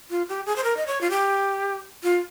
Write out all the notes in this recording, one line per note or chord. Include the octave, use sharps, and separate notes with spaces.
F4
G4
G#4
C5
A#4
D#5
C#5
F4
G4
F4